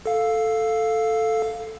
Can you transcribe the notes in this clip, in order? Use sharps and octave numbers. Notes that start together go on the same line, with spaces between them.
A4 F5